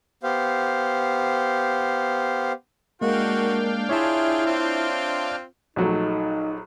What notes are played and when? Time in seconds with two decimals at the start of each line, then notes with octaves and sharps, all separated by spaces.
0.23 B3 G4 C5 F5
3.01 G#3 A#3 D4 F#4 A#4 F5 G5
3.89 E4 F4 G#4 C#5 E5 A5
4.46 C4 F4
5.76 A#1 F#3 A3 D#4